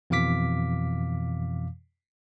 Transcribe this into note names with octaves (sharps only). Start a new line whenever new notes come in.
F2 B2 E3 F5 D6 B6